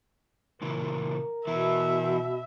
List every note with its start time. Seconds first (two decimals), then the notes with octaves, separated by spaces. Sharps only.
0.62 A#2 C#3 E3 A#4
1.47 B2 E3 B3 E5